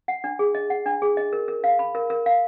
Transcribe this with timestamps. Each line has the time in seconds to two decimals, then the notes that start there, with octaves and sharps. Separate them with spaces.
0.08 F#5
0.24 D4
0.39 G#4
0.55 D#5
0.70 F#5
0.86 D4
1.02 G#4
1.17 D#5
1.33 A#4
1.48 A#4
1.64 F5
1.79 B5
1.95 A#4
2.10 A#4
2.26 F5